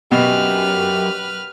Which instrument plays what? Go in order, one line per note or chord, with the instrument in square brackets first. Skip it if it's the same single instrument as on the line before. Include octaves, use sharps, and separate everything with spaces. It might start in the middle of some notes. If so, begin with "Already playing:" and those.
[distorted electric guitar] F#2 [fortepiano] B2 [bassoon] G4 [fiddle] B4 F6